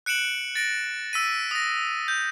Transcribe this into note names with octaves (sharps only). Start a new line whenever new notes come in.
F#6 C#7 D7 E7 F#7
A6 A#6 D7
E6 B6 D#7
D#6 A#6
G6